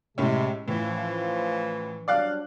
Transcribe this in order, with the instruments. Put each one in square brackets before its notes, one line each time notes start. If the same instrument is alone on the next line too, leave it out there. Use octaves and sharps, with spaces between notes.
[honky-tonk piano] A2 C#4 [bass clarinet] C3 [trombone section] G#3
[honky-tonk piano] A2 [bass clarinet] E3 [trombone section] F3 C#4
[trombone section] F#3 G3 D4 [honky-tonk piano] D5 F5 F#6